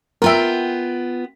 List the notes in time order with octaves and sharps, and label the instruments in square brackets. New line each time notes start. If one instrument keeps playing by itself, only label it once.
[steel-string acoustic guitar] B3 F4 G5 [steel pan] A#4 E5